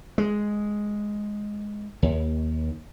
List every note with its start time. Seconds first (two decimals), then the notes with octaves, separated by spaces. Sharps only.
0.18 G#3
2.03 D#2